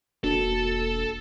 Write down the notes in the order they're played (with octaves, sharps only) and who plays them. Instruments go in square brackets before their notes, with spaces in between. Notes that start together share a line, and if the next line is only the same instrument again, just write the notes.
[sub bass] E1 [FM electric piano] A#3 D4 F#4 [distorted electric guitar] A4